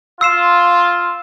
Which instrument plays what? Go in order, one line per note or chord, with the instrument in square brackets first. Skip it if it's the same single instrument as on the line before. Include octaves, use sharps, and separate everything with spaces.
[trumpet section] F4 [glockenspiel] E6 C7 E7